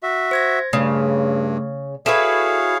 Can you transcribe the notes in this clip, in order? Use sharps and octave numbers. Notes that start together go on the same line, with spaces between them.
F#4 E5
C5 G#6 A#6
G2 C#3 A3
E4 F#4 G#4 A4 B4 C#5 F5